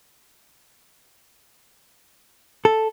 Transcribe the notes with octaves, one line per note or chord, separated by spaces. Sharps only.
A4